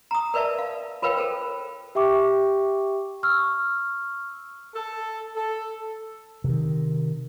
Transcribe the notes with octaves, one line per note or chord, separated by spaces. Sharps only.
A#5 D#6
A#4 B4 D5 E5 A5
F5
F4 A#4 B4 C#5 F5 G5
A4 A#4 C5
G4 E5 G5 C#6 D6
C#6 E6 F6
A4
A4
C3 D#3